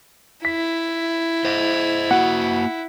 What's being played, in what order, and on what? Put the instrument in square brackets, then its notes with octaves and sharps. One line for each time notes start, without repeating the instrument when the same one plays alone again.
[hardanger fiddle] E4 [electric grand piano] B6
[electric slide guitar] C5 D#5
[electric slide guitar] A#3 F#4 [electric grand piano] F#5